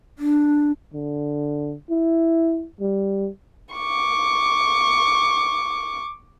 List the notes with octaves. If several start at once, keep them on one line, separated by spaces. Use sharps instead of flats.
D4
D3
E4
G3
C#6 D6